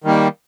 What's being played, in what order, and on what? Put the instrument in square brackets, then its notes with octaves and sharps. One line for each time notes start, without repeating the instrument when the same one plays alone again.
[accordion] D#3 G3 A#3